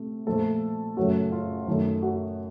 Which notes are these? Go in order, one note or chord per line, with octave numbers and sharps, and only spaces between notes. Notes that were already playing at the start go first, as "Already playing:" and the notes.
Already playing: C3 A3
A#2 F3 A3 A4
F#2 C#3 F#3 A3 F#4
F4
F#2 D#3 A3
F#4